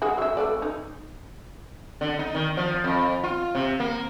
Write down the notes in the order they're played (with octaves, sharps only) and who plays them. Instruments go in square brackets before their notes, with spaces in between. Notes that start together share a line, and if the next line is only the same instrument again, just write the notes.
[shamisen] G#3 F#4
F#3 E5
A3 B4 D5
D#4
[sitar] D3
D#4
D#3
F3
F2
F4
C3
A#3